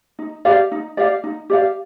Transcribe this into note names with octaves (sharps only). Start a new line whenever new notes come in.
D#4
G4 D5 F5
D#4
G4 D5 F5
D#4
G4 D5 F5